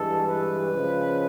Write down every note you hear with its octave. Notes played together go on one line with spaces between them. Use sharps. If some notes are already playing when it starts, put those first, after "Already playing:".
Already playing: G2 E3 G#3 A4
B4
C#3 F3 G#3